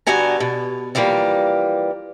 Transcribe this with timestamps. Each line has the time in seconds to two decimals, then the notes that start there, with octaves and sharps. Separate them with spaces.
0.07 G2 D3 B3 F#4 G#5 A#5
0.40 B2
0.95 D3 E3 F3 G3 A#3